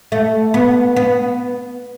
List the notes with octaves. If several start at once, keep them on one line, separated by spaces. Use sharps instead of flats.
A3
B3
B3